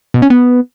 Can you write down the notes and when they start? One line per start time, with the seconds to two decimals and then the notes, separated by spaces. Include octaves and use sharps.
0.14 B2
0.22 C#4
0.30 B3